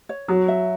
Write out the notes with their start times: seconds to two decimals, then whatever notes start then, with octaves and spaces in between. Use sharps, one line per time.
0.09 C#5
0.28 F#3 F#4
0.48 E5